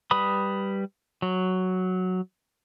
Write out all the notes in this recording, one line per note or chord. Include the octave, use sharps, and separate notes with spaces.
G3 B4 B5 D#6
F#3